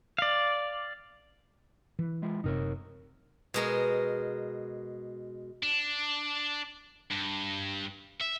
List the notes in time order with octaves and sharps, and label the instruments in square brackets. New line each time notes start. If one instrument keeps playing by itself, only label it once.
[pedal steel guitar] D5 F5
[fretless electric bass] E3
[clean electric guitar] G#3 E4 F4
[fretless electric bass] F#1 C3 [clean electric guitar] D#4 A#4 C#5
[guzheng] B2 G#3 A#4
[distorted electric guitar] D4
G2
E5